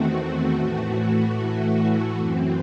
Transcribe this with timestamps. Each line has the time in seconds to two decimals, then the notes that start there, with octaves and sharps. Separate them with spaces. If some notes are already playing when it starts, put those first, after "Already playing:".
Already playing: E2 D#3 A3 C4 F#4
0.52 A2 E3 A3
2.16 F#2 E3 C4